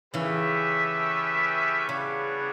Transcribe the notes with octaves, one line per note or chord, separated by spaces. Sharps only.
C#3 E3 A3 C#4 G4 B4 E5
C#3 G3 B3 D4 F#4 C#5